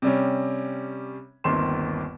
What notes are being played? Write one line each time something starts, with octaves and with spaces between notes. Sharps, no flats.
C3 G3 C#4
G1 D#2 D#3 C4 C6 E7